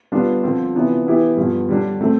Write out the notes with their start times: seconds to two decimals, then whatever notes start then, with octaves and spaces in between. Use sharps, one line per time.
0.12 D3 G3 B3 D4 F4
0.43 D3 F3 C4 F4
0.75 C3 E3 B3 D4 F4
1.06 E3 B3 E4 G4
1.37 G2 D3 F3 B3
1.69 D3 G3 D4
2.00 D3 A3 C4